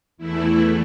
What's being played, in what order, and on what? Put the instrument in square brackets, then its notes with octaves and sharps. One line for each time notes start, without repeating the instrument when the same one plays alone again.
[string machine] E2 E3 A3 E4